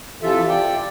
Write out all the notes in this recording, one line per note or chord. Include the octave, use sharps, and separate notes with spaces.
C3 E3 F3 F4 A4 E5
D5 G5